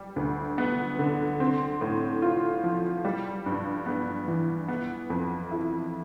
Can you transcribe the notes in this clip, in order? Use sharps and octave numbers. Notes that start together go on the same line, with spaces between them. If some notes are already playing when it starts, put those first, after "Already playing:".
Already playing: G3
D2
B3
D3
C4
A2
F4
F3
G3
G2
B3
E3
B3
F2
E4